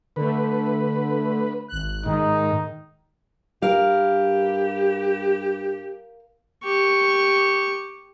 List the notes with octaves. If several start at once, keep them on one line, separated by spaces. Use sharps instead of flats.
D3 A3 B4
G#1 F#6
G#2 D#3 D#4
G2 G4 A#4 F5
G4 C#6